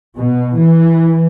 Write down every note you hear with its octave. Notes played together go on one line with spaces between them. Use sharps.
B2
E3